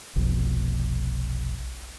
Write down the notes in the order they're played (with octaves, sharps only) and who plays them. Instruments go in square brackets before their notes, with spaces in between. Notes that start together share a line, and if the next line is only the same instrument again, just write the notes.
[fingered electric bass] F1 B1 F2